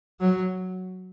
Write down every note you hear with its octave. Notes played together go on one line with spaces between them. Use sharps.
F#3